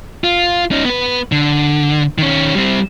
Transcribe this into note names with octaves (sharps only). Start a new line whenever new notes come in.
F4
C#4 D#4
B3 B4
D3
D#3 C#4
G3 C4